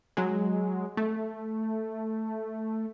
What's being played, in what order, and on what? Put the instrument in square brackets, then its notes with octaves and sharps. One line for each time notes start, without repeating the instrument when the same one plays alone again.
[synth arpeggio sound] F#3 G#3
A3